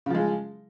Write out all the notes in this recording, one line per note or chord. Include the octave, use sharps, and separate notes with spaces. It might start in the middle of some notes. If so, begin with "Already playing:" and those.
C#3 F3 G#3